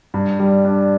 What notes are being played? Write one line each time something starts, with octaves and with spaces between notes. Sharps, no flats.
G2
G3
D4